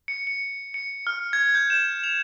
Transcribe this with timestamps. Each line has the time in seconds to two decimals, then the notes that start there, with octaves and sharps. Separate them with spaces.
0.08 C#7
0.27 C#7
0.74 C#7
1.07 F6
1.33 G#6
1.55 G6
1.70 E7
2.04 F7